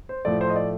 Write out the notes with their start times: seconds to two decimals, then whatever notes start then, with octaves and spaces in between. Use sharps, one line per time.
0.09 C5
0.25 A2 F3 A3 D5
0.41 C5
0.50 D#5
0.56 D5